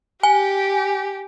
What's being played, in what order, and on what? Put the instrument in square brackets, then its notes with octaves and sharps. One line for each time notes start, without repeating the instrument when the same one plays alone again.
[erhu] G4 [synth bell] G#5